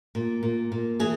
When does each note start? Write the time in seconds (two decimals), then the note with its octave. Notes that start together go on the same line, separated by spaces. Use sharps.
0.15 A#2
0.43 A#2
0.72 A#2
1.00 E3 G#4